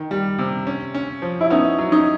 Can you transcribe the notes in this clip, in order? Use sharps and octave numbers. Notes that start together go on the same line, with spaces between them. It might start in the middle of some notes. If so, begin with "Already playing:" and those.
Already playing: D#3
G3
C3
C#4
C#4
F3
E4
B3 C#4 D#4
F#3
C#4 D#4